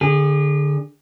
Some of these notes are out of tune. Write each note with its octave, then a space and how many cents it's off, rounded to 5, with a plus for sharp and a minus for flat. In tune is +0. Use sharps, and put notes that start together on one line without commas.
D3 +0 G#4 -30